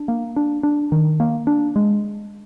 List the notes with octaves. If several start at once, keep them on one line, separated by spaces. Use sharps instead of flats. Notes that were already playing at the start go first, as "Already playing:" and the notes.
Already playing: D4
A#3
D4
D4
D#3
A#3
D4
G#3